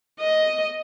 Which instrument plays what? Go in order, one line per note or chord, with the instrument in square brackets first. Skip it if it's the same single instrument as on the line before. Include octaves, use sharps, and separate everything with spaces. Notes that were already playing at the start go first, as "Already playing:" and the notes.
[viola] D#5